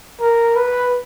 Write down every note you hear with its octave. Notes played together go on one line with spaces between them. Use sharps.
A#4
B4